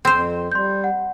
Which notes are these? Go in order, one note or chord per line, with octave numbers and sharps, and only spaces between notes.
F2 C4 C5
G3 C6 G6
F#5